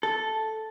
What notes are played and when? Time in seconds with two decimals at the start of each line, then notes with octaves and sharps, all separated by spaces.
0.03 A4